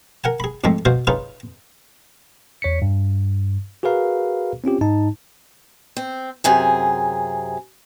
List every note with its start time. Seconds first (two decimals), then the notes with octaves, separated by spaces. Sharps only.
0.24 A#4 F#5 G#5
0.40 G#4 B5
0.64 F2 G#2 G#3 A3 C4
0.85 B2 F#4 C5 F5
1.07 C#4 D#4 F4 G#4 B4
2.62 E2 C#5 B6 C#7
2.82 G2
3.83 F#4 G#4 A#4 B4 F5 A#5
4.64 C4 C#4 F4 G4
4.81 G#2 D#4 A5
5.97 C4
6.44 F#2 C3 G#4